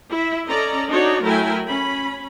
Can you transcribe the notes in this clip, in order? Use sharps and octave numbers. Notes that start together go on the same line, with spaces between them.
E4 E5
C#4 A4 D5 D#5 A#5
D4 D#4 F#4 C#5 D5
F#3 A3 E4 A#4 G5 G#5
C#4 B5